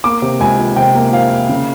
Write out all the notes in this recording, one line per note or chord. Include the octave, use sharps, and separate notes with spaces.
A#3 D6
C3
C#2 G#5
F3
C3 G5
A#3
F3 F5
A#3
C#3